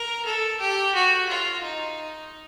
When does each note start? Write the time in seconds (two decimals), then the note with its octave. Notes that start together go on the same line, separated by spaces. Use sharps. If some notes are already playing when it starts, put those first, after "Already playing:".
Already playing: A#4
0.25 A4
0.60 G4
0.94 F#4
1.29 F4
1.63 D#4